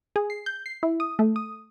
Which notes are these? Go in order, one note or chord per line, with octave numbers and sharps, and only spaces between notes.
G#4
C7
G6
C7
E4
D#6
A3
D#6